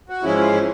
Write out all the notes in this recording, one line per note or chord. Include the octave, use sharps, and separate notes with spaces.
F#4
G#2 F3 G#3 C#4 E4
F4
E4